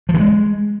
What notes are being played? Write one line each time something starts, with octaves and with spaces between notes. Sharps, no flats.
F3
E3
G#3